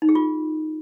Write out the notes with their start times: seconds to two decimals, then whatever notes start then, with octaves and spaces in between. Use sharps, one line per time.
0.02 D#4
0.09 G#4
0.15 F4